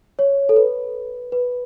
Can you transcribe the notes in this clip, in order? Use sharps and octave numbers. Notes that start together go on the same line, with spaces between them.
C#5
A4
B4
B4